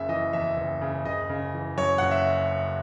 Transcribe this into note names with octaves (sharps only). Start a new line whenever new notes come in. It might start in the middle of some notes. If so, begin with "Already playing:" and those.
Already playing: F#1 C#3 E5
E3 D#5
E2 E5
F#1
C#3
F#1 D#5
C#3
E3
F#2 C#5
F#1 F#5
E5